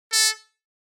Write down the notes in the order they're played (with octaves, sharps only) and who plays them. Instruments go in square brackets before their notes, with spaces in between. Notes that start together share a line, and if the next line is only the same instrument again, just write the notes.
[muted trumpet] A4